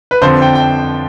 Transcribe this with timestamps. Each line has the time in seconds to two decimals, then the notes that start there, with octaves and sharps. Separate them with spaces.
0.11 B4
0.22 F2 D3 F3 C5
0.42 G5
0.55 G5